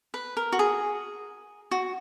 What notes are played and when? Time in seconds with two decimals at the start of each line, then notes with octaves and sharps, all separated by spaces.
0.14 B4
0.37 A#4
0.52 F#4
0.59 G#4
1.71 F#4